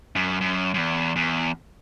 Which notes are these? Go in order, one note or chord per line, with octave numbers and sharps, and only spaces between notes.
F#2
F#2
F#2
E2
E2